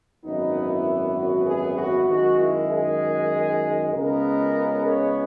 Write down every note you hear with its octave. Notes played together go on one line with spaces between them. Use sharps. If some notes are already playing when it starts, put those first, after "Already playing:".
G#1 F#2 E3 B3 D#4
E4
F#4
G#4
F#4
F#2 D#3 G#3 F#4
E4
G#4
C#2 C#3 G#3 B3 A#4
C#5